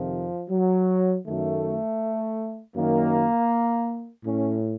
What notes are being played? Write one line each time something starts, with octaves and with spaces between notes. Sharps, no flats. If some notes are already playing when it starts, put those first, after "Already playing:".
Already playing: F2 C3 D#3 F3
F#3
F#2 D#3 A3
F#2 D#3 A#3
A2 C#4